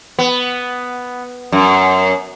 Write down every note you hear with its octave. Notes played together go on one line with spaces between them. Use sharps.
B3
F#2